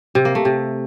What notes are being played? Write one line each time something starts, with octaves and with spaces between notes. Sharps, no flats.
C3
A#3
A3
C3